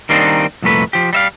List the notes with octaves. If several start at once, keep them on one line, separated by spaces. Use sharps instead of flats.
D#3 G3 A#3 C4 D4 D#4
C2 F2 A#2 A3 B4
F3 G4
G3 E5 F5